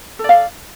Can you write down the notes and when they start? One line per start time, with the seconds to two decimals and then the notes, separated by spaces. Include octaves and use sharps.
0.19 A4
0.24 D5
0.29 F5